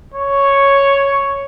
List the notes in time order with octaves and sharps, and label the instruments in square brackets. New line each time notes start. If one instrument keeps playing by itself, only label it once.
[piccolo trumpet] C#5